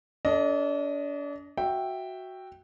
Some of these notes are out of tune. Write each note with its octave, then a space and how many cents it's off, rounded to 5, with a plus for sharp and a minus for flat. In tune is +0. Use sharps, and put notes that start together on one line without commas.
D4 -40 A4 +10 D#5 +0
F#4 +0 E5 +0 G5 +0